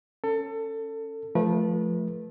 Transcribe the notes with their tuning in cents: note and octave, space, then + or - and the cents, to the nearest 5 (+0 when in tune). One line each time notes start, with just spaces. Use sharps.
C#4 +0 A4 +25
F3 +0 A3 -20 B4 -40